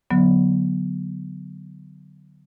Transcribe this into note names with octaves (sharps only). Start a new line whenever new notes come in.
D3 F#3 B3